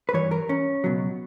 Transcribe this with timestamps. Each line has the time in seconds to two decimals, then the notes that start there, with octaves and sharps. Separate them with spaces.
0.09 B4
0.13 G2 E3 G3 C#5
0.31 A#4
0.49 C#4
0.84 C#2 B2 F#3